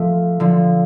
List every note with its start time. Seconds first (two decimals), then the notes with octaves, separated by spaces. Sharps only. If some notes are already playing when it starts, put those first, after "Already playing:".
Already playing: F3 A3
0.40 D3 F3